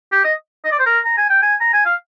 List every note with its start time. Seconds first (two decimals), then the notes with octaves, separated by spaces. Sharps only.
0.12 G4
0.24 D#5
0.65 D#5
0.72 D5
0.79 C5
0.86 A#4
1.05 A#5
1.17 G#5
1.30 G5
1.42 G#5
1.61 A#5
1.73 G#5
1.85 F5